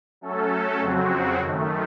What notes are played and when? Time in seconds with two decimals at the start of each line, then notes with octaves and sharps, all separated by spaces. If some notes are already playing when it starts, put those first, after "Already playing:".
0.21 F#3 A3 C#4 A4
0.80 F2 C#3 F#3 C4 F#4
1.39 F#2 D#3 A3